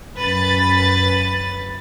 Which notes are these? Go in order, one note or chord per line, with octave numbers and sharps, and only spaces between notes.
F#2 B4 A6